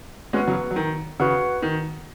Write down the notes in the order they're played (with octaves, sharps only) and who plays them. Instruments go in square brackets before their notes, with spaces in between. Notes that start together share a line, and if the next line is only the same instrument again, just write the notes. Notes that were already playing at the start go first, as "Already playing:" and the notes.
[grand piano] G#3 C#4 [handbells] B3 F#4 B4 F#5
[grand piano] C#3 F#3
F#3
D#3
[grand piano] C#3 [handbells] F#4 B4 F#5
[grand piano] D#3